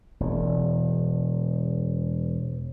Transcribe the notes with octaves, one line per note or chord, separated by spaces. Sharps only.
E1 E2